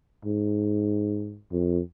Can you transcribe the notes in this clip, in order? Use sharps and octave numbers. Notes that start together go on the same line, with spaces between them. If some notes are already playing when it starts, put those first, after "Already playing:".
G#2
F2